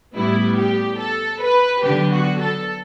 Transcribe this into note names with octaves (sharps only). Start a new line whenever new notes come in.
A2 G3 B3 E4
G4
A4
B4
D3 F#3 B3 G4
F#4
A4